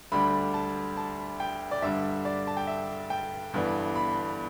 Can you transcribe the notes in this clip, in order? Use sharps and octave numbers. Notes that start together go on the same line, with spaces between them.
D2 D3 G3 D4 B5
A5
A5
G5
D5
G2 D3 G3 E5
D5
A5
G5
E5
G5
G1 G2 E3 B3 D4
B5